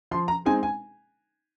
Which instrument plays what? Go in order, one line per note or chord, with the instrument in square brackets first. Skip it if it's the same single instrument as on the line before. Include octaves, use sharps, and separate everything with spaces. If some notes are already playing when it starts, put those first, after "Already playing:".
[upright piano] F3 C6
A#5
G#3 C4 D#4 G#5
G#5